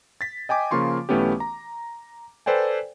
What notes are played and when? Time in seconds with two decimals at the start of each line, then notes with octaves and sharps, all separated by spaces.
0.21 A6 B6
0.49 D#5 G5 G#5 D6
0.71 C#3 F3 A#3 F4 C6 C#6
1.09 B1 E3 A3 B3 C#4 G4
1.40 A#5
2.46 A4 B4 C5 D5 G5 G#5